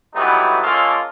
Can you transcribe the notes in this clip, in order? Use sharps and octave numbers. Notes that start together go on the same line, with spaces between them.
E3 F#3 G3 A3 B3 D#4
G#3 A#3 C#4 F4 A4